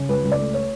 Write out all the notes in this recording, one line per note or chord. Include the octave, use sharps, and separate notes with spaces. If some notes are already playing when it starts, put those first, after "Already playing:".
Already playing: C#3
C#2 B4
C#2
D5
A3
C#5